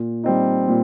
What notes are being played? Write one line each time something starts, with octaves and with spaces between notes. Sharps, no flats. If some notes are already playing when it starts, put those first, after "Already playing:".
Already playing: A#2
G3 C4 D#4
A#2